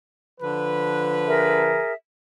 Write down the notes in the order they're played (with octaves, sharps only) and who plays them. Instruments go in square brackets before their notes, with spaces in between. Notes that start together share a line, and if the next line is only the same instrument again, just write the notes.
[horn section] D3 F3 B4
[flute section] G#4 A#4 E5